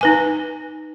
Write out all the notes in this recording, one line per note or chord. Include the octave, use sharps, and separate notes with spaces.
D#4 B4 G#5